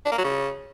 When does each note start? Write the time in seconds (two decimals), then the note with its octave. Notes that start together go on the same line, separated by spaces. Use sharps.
0.05 D4
0.12 A#3
0.18 F#3
0.24 C#3